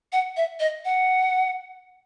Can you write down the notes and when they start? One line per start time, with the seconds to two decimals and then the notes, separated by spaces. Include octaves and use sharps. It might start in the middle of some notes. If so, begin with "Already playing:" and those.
0.12 F#5
0.37 E5
0.60 D#5
0.85 F#5